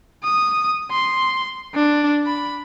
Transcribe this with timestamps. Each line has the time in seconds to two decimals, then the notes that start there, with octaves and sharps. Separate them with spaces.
0.23 D#6
0.91 C6
1.74 D4
2.26 B5